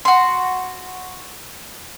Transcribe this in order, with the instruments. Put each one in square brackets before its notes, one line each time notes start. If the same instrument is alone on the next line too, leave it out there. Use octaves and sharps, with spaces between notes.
[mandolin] F#4 C6